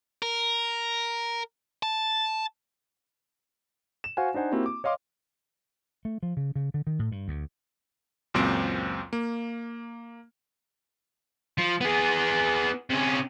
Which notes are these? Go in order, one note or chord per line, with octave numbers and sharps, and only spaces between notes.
A#4
A5
E7
F#4 C5 F5 F#5 G#5
D4 D#4 C5 F#5 G#5
A#3 C4 E4 F#4 G4
D6
C#5 D#5 F5 C6 D6
A3
F3
C#3
C#3
D3
D#3
A2
G2
D2
C#2 F#2 A#2 C4 C5 D7
A#3
F3
B3 G#4
C3 C#4